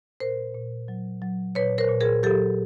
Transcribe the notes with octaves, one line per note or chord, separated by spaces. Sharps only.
A#2 A#4 C5
A#2
F#3
F#3
A#2 B4 C#5
A#4 C5
A#2
G#4 A#4
F#3 G4 A4